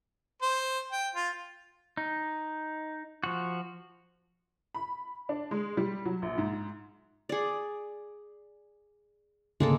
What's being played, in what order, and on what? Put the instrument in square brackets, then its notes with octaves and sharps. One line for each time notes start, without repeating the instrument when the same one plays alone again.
[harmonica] C5
G5
F4
[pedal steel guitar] D#4
F3 F#4
[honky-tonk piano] B5
D4
G#3
G3
F#3
A#1
G#2
[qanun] G#4 D5
[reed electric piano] D2 G#2 C#3 [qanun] G#3 A#3 A4